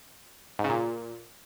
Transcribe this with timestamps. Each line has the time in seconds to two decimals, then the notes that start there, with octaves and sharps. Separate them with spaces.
0.59 G#2
0.64 C#3
0.69 A#2